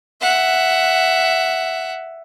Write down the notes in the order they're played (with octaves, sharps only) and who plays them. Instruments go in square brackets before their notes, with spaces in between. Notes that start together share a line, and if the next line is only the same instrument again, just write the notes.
[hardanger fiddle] E5 F#5